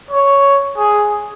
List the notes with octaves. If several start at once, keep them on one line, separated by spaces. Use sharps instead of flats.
C#5
G#4